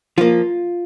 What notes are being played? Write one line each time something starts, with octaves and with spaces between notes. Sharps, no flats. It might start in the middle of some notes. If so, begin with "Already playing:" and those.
F3 A#3 F4